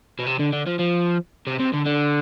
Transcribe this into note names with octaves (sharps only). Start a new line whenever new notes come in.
B2
C3
D3
D3
F3
F3
C3
C3
D3
D3